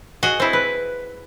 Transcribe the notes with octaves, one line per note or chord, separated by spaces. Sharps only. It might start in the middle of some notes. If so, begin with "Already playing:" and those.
F#4 G#4 D#5
C4 E4
B4